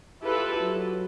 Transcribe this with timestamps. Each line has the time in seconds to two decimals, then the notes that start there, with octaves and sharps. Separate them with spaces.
0.24 E4 F4 G4 A4 B4
0.60 F#3